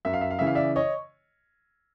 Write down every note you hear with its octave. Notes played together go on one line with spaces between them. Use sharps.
F#2 E5
F5
E5
F5
C#3 E3 E5
F5
D5 E5
C#5 D#5